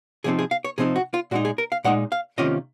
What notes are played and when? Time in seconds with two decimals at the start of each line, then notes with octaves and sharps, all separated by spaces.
0.24 C3 F3 C4 D#4 G#4
0.39 G#4
0.51 F5
0.64 C#5
0.78 C3 F3 C4 D#4 G#4
0.96 F#4
1.14 F4
1.31 A#2 G#3 D#4 F#4
1.45 G#4
1.58 A#4
1.72 F5
1.84 A#2 G#3 D#4 F#5
2.12 F5
2.38 C3 D#3 A#3 C#4 F4 D#5